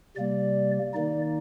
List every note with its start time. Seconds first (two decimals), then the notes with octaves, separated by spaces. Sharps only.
0.16 C3 G3 A#3 D5
0.94 D#3 A#3 D#4 D5